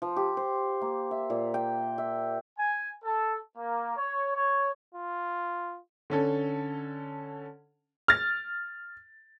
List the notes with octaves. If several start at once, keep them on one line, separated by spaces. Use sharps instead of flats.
F3
G4
C5
A#3
E5
A#2
G5
E5
G#5
A4
A#3
C#5
C#5
F4
D3 C#4 A4
F6 A6